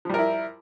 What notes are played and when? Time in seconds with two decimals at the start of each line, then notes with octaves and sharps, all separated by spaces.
0.05 F3
0.10 G3
0.14 A#4
0.18 E4